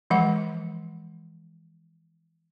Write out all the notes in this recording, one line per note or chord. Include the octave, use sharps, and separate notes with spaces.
E3 F3 G#3 F#5 B5